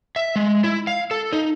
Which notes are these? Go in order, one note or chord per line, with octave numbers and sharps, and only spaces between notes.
E5
G#3
E4
F5
A4
D#4